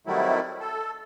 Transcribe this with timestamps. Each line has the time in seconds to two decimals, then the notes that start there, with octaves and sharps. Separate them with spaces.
0.07 C3 D#3 F#3 G3 A3 E4
0.60 A4